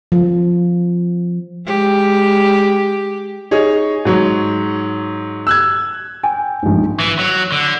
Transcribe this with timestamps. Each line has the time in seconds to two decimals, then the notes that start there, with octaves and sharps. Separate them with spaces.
0.12 F3
1.66 G#3 G4
3.51 D#4 G#4 C#5 D#5
4.05 G#2 F#3 C#5
5.47 E6 F#6 G#6
6.23 G5 G#5
6.63 A#1 G#2
7.00 E3
7.19 F#3
7.52 D3